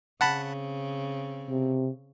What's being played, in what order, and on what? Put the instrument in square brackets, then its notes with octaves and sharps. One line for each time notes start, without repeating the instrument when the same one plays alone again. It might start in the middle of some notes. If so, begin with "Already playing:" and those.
[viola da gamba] C#3 C4 [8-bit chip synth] F#5 A5 B5
[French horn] C3